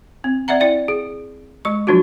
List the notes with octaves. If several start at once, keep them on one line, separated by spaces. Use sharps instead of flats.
C4
C4 D5 E5 F#5 A#5
E4 D5 G5
G#4
G#3 C#6
F3 F#3 D4 F4 F#4